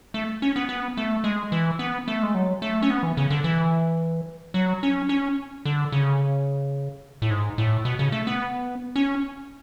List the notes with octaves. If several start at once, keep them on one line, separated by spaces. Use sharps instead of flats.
A3
C#4
B3
B3
A3
G#3
E3
B3
A3
G#3
F#3
A3
C#4
B3
E3
C#3
D3
E3
F#3
C#4
C#4
D3
C#3
A2
G#2
A2
B2
C#3
A3
B3
C#4